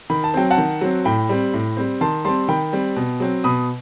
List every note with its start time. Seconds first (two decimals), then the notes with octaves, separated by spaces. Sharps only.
0.10 D#3 B5
0.24 A5
0.34 F#3 C4 G5
0.50 F#5 A5
0.58 D#3
0.81 F#3 C4
1.05 A2 G5 B5
1.29 G3 C4
1.53 A2
1.77 G3 C4
2.01 D#3 A5 C6
2.25 G3 C4 A5 C6
2.48 D#3 G5 B5
2.73 G3 C4
2.96 B2
3.20 F#3 C4
3.44 B2 B5 D#6